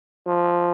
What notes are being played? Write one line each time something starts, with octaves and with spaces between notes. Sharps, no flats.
F3